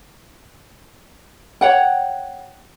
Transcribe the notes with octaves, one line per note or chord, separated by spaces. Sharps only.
C#5 F#5 G5